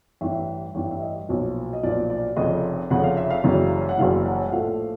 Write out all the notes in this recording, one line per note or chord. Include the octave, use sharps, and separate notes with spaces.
A1 G2 E3 E5
A1 G2 E3
E5
D#5
B1 A#2 F3
D#5
B1 A#2 F3 D5
D5
F1 F2 C#3 D#5
F1 F2 C#3 F#5
F5
E5
F5
F#1 F#2 C#3 E3 G3
F#5
F#1 F#2 C#3 E3 G3 F5
F#5
F#5
A#1 A2 F3 A3 F5